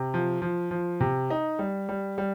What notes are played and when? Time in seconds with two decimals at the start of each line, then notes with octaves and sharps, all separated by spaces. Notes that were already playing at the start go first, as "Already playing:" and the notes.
Already playing: C3
0.14 F3
0.42 F3
0.71 F3
1.00 C3
1.30 D#4
1.59 G3
1.89 G3
2.18 G3